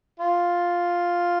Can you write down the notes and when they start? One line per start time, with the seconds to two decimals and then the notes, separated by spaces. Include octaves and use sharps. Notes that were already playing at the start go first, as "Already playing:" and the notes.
0.20 F4